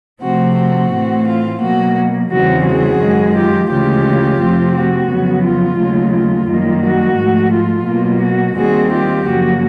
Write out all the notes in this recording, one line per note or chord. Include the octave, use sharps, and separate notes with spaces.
C3 F3 A3 C4 F#4
F#4
A2 E3 A3 C4
F4
B2 F#3 A#3 F#4
E2 C#3 E3 G3 C4 F#4
F#4 G#4
F#2 D#3 G#3
F4 G4
D2 C#3 E3 G#3 F4 G4
F2 C3 F3 A3 C4
F#4
F2 C#3 F#3 B3
F4
D#2 C#3 F#3 A3
F4
F#2 D#3 G3 A#3
F#4
G#2 F3 A3
F4
B2 F#3 A#3
F#4
D#2 D#3 G3 C4 F#4 G#4
F4 G4
F#2 C#3 F3 A#3 F#4